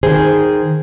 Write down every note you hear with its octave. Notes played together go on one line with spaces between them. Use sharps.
D#3 G#4 C5